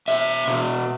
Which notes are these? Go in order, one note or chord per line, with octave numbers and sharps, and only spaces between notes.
B2 E5
B2